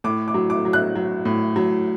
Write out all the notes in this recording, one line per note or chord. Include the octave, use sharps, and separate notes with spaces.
A2 D6
D6
F#3
D6
F#3
F#6
F#3
A2
F#3